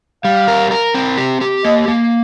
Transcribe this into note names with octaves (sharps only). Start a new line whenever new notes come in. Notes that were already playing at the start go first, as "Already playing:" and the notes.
G3 F5
A#4
A#4
C4
G4
G4
A#3 D#5
A#3